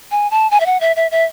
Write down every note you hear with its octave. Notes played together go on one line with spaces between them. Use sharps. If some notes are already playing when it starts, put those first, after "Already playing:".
G#5
A5
G#5
E5
F#5
E5
E5
E5